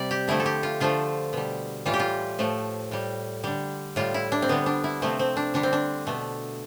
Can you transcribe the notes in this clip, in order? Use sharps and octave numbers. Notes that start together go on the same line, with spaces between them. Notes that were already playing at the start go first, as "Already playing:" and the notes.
Already playing: C3 G3 D5
G4
D3 F3 A3 E4
A4
G4
F4
D3 F3 A3 F4
B2 G3
A2 E3 G3 F4
G4
F4
A2 F3 A3
A2 G3
D3 G3
A2 G3 F4
E4
D4
C4
D3 G3 B3
D4
E4
C3 F3 A3 C4
C4
D4
D3 G3 D4
C4
D4
B2 A3